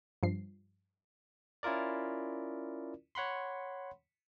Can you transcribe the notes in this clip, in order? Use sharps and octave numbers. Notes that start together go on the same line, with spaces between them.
G2 F3 C7
C#4 E4 F4 A#4 D5
C#5 F#5 B5 C6